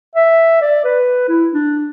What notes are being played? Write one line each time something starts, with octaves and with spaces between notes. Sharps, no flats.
E5
D5
B4
E4
D4